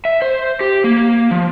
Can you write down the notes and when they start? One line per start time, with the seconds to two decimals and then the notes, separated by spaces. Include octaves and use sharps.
0.05 E5
0.22 C5
0.61 G4
0.84 A#3
1.31 F3